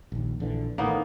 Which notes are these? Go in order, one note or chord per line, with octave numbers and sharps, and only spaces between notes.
A#1 D#2
A#1 D3 E3
A1 A2 D#3 A#3 B3 D#4